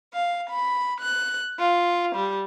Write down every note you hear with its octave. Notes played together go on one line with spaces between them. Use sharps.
F5
B5
F#6
F4
G3